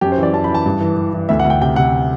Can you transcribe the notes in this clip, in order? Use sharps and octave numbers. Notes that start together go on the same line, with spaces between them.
F#2 G4
C5
E3
D5
F#2 A5
B5
E3
A5
G2
E3
E3
E3
D2 E5
F#5
D2
G5
C3 G5
C3 F#5